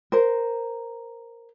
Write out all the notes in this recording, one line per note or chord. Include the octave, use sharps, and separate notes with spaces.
A#4 C5